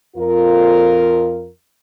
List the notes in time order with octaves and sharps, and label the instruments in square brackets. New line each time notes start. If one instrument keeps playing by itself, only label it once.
[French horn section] F2 F4 A#4